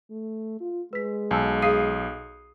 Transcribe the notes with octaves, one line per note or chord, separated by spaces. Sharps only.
A3
F4
G#3 B4 B6
B1 G#5 A5 E6
G#4 F5 D#6 C7 D#7